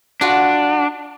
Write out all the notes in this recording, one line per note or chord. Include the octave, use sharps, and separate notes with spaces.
D4 F4 F#4 F#5